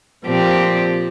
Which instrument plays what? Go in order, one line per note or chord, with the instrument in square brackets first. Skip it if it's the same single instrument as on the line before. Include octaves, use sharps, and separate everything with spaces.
[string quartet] A#2 F3 C4 G4